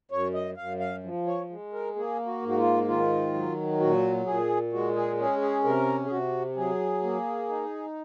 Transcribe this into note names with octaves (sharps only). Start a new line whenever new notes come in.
F#2 C#5
D#5
F#2 F5
F5
F3
C#5
G#3
A#4
A#3 G#4
F#4
G#2
F#4
F4
D#3 F4
F#3
A#2 F#4
A#2 G#4
G#3 F#4
G#4
C#4 G#4
G#4
C3 A#4
G#4
C3 F#4
F#3 G#4
A#3
D#4